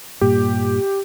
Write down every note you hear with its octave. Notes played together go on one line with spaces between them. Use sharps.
G2 A#2 G4